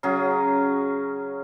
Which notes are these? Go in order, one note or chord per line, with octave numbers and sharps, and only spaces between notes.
C#3 F#3 C#4 G#4